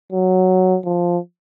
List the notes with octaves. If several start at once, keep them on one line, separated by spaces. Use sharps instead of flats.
F#3
F3